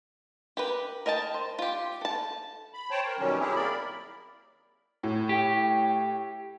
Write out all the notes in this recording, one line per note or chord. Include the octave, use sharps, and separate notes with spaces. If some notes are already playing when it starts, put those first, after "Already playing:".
G4 A#4 B4
A#4 D#5 G5 A5
C5
F4 G4
A4 A5
B5
C5 C#5 G5 A5
A#4
B2 D#3 F#3 G3 C#4
F#3 C4 E4 G4 G#4
A#3 A#4 D5 B5
A2
G4